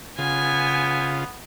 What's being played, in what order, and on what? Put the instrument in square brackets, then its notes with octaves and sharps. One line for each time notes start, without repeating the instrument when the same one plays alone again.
[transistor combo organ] C#3 F4 [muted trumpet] B3 [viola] G#5